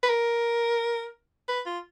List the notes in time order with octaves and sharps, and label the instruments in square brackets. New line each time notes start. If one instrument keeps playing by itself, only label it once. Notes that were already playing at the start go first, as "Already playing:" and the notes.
[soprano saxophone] B4
A#4
B4
F4